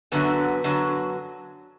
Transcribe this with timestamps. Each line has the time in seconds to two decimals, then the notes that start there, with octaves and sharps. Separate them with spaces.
0.12 F#2 D3 F#3 B3
0.64 F#2 D3 F#3